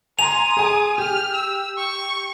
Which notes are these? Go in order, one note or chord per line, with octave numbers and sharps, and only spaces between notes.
G#5 A#5 C6 D#6 F7
G#4 G#5
G4 F6
E6
C#6